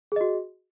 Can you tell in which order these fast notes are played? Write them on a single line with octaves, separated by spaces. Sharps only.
G#4 D#5 F#4